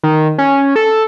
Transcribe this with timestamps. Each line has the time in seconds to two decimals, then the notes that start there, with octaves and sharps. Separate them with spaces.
0.03 D#3
0.38 C#4
0.76 A4